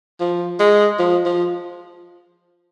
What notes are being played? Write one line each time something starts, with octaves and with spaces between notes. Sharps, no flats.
F3
G#3
F3
F3